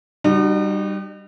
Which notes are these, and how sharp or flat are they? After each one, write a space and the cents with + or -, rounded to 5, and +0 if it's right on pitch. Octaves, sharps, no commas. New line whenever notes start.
G3 +0 D#4 -45 F#4 +20